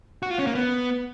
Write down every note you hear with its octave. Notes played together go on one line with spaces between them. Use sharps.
F#4
F4
C#4
A#3
B3